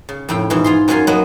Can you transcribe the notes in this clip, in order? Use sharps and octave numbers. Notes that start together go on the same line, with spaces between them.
C#3
F2 A2 G5
G#2 B2 E3
F4 G#4 C6
F#2 F#3 C#4 F4 G#5 C6
F#3 A#3 B3 B4 D#5